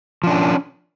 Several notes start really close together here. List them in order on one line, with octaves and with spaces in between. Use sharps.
F3 D4 C#4